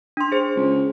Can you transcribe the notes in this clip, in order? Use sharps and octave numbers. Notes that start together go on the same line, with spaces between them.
D4 C6
G#4 C5
C#2